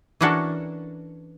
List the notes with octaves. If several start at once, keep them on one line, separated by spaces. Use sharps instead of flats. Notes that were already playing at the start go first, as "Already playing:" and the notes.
E3 C#4 D4 F#4 A4 A#4